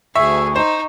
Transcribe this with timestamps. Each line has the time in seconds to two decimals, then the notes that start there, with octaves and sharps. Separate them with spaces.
0.16 D2 G#4 E5 C#6
0.56 D#4 C5